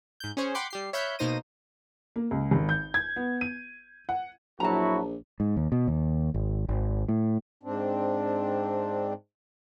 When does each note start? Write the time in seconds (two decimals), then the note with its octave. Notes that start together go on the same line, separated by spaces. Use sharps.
0.20 G#2 G6
0.37 C#4 G#4 C5 C#5
0.55 F#5 G5 B5 C6 D6 C7
0.70 G3 G4 C7
0.93 C#5 E5 F5 B5 F#6 G6
1.19 B2 A#3 D#4 C5 A#6 D#7
2.16 A#3
2.31 C#2
2.51 G#1
2.69 G6
2.94 G#6
3.16 B3
3.41 D#7
4.09 F#5
4.60 A#1 F#3 E4 F#4 A5 A#5
5.40 G#2
5.56 D#2
5.72 B2
5.88 D#2
6.34 G#1
6.69 G#1
7.09 A2
7.63 G#2 C4 D4